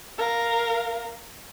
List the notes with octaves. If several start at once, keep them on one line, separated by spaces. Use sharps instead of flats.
A#4 F5